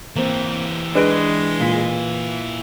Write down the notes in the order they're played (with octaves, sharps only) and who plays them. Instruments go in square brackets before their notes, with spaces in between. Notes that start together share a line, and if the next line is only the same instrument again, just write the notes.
[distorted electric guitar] E3 G4 [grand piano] A#3 C4
[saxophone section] G#3 [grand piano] D4 B4 D7
[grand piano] A#2 B6